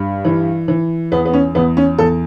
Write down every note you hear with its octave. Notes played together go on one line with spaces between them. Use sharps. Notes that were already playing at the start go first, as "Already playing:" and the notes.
Already playing: G2
E3
E3
E2 B3
B3
C#4
E2 B3
C#4
E2 A4